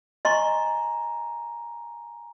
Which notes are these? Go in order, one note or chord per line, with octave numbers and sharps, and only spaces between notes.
D#5 G#5 A#5 C6 C#6